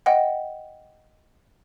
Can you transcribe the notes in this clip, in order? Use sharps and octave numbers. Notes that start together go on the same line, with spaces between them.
D#5 F#5 G5